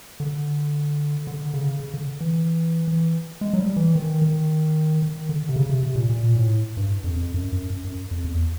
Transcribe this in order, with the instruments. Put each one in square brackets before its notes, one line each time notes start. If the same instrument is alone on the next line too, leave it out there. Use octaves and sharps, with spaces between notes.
[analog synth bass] D3
D3
C#3
C#3
D3
E3
E3
G#3
F#3
G3
E3
D#3
D#3
D#3
D3
C3
C#3
C3
C3
A#2
A#2
A2
G2
F2
F2
F#2
F#2
F#2
F#2
F2
E2